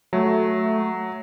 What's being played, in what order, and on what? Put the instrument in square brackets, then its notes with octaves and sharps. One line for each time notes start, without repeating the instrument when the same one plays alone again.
[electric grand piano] F#3 [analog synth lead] A3